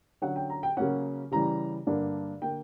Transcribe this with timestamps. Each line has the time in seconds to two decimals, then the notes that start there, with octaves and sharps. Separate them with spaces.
0.22 D3 F#3 C#4 F#5
0.36 G5
0.50 A#5
0.63 G5
0.77 C#3 F#3 A#3 C#4 F#5
1.32 C#3 E3 G3 A#5
1.87 G2 D3 A#3 D4
2.42 D3 A#3 G5